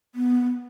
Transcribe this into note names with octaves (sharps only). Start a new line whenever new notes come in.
B3